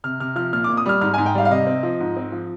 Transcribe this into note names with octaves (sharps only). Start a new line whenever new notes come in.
C3 F6
C3 F6
F3 F6
A#2 F6
D6
A#2
D#6
G3 F6
G#2 F6
G#5
G#2
G5
G3 F5
F5
C3 D#5
C4
F3
G#2
C4
F3